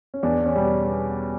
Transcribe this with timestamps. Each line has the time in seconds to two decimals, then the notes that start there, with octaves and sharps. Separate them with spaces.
0.14 C#4
0.23 E2 D4
0.45 C#4
0.56 B2 G3